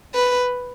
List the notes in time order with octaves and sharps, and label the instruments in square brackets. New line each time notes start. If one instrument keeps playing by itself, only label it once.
[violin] B4